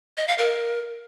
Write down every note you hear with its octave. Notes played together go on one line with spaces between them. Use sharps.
D#5
F5
A#4